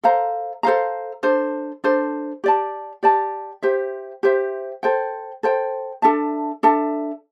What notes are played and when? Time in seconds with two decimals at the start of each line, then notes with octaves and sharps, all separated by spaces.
0.04 A4 C5 F5 A#5
0.63 A4 C5 F5 A#5
1.23 D4 A4 C5
1.84 D4 A4 C5
2.44 G4 D5 A5
3.03 G4 D5 A5
3.63 G4 C5 E5
4.23 G4 C5 E5
4.83 A4 C5 G5
5.43 A4 C5 G5
6.02 D4 A4 E5 A5
6.63 D4 A4 E5 A5